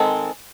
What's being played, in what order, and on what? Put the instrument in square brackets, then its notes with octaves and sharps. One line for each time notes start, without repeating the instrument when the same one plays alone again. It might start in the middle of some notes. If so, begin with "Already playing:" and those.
Already playing: [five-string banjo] D#3 G#3 C4 A4